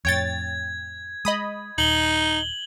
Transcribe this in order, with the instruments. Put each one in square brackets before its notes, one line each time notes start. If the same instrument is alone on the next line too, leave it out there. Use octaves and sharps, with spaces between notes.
[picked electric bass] F2 A2 [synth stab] C#5 G5 A6 [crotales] G#6
[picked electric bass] G#3 [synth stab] D#5 B5 D#6
[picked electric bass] D#1 [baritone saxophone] D#4 [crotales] F#7 G7